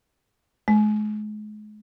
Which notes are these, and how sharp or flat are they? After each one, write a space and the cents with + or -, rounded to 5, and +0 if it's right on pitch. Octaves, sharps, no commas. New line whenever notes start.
G#3 +35